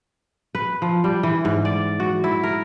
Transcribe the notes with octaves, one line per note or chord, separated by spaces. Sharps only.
B4
F3
G3
E3
G#2
D5
F#4
E4
A#4